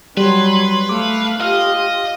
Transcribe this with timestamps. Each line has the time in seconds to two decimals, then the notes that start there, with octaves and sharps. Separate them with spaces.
0.17 F#3 G3 B4 C6
0.89 A3 F5 D6
1.40 F4 G4 D#5 F5 F6